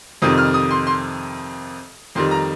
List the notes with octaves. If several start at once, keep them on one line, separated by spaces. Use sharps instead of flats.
F2 C3 D#3 G3 D#6
F6
D#6
C6
C6
F2 D#3 G3 C6
A#5